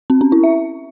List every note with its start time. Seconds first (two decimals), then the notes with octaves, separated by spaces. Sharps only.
0.10 C4
0.21 C#4
0.32 E4
0.44 E5